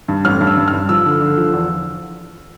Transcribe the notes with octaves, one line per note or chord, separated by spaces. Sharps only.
G2
A1 F6
G2
E6
G2
F6
G2
F3 E6
D3
D3
F3
E2